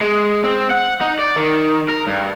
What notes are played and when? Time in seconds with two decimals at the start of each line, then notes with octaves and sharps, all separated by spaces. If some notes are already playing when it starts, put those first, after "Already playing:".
0.01 G#3
0.44 C4
0.71 F#5
1.01 D#4
1.19 D5
1.36 D#3
1.88 A#4
2.07 G2